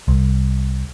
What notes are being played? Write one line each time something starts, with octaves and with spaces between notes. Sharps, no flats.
C2